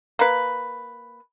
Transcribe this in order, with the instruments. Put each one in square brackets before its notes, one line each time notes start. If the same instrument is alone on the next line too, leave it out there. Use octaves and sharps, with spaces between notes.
[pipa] A#3 B4